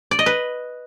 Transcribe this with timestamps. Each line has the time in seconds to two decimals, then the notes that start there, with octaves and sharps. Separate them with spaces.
0.11 D5
0.19 D#5
0.26 B4